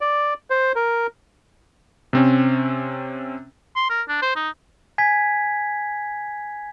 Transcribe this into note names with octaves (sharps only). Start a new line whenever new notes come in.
D5
C5
A#4
C3 C4 C#4
C6
A#4
D4
C5
D#4
G#5 G#6 B6